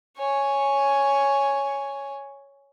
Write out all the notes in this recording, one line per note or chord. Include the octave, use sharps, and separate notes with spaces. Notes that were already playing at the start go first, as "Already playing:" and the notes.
C#5 G#5